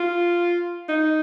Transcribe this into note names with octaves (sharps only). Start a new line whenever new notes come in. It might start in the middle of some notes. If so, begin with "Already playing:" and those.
Already playing: F4
D#4